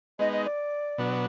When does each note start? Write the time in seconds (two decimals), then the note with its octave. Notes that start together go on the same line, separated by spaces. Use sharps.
0.19 G#3 B3 D#4 D#5
0.32 D#5
0.45 D5
0.98 B2 F#3 B3 D4